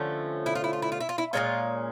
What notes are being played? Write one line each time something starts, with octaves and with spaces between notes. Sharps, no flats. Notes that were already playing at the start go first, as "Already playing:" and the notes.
Already playing: D3 F3 A3 C#4
E4
F4
E4
F4
E4
F4
E4
F4
E4
A#2 F3 G#3 C#4 F4